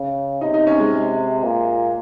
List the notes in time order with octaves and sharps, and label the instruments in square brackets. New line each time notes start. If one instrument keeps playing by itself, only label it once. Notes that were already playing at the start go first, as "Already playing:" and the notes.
Already playing: [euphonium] C#3
[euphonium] C3 [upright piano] D#4
[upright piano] D#4
C#4
G#3
[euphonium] A#2